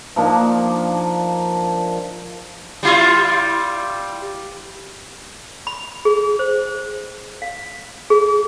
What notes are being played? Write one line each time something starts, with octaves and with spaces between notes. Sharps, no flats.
F3 A#3 D4 D#4
G3 E4 F4
B5
G#4
C5
F5
G#4